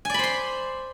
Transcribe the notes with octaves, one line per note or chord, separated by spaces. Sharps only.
C5 D5 G#5 B5 C6